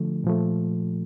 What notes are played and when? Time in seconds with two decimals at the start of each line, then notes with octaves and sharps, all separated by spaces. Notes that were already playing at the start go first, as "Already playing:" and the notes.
Already playing: D3 F3 A3
0.24 A#2 F3 A3